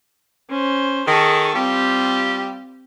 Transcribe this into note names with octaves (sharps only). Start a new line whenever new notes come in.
C#4 C5
D#3 G#4 A4 C#6
G3 C4 F4 G4